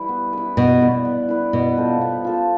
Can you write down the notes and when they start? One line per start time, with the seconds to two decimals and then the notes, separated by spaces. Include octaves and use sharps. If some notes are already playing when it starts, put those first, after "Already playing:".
Already playing: E3 G3 E4 B4
0.09 B3
0.33 E4 B4
0.57 B2 B3
0.81 E4 B4 D5
1.05 B3
1.29 E4 B4 D5
1.53 B2 B3
1.77 F4 A4 C5
2.01 B3
2.25 F4 A4 C5